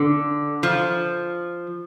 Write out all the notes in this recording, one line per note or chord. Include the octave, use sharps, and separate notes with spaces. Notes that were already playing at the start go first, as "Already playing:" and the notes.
Already playing: D3
F3